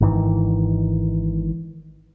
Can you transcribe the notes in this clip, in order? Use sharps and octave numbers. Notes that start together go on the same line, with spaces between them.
G#1 G#2 D#3 E3